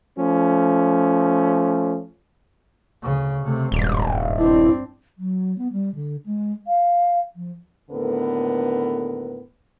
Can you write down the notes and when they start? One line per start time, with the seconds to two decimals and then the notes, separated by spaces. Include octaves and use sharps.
0.18 F3 A3 C#4
3.03 D2 C#3
3.42 C3 A3
3.72 D#1 G#1 G2
4.38 C4 D4 E4
5.18 F#3
5.58 B3
5.73 G3
5.95 D3
6.26 G#3
6.67 F5
7.36 F3
7.91 D#2 A2 D3 B3 A#4 B4